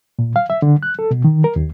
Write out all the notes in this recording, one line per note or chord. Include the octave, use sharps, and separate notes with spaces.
A#2
F5
E5
D3
F#6
A4
B2
D#3
A#4
D#2